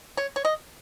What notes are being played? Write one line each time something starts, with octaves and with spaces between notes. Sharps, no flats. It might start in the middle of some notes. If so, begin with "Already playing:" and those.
C#5
C#5
D#5